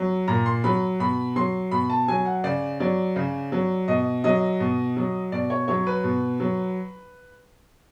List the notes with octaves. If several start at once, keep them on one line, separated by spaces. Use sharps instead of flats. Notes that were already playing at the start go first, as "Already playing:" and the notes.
Already playing: F#3
A#2 A#5
C6
F#3 B5
B2 B5
F#3 C6
B2 B5
A5
F#3 G#5
F#5
C#3 D5
F#3 D5
C#3
F#3
B2 D#5
F#3 D#5
B2
F#3
B2 D5
C#5
F#3 C#5
B4
B2
F#3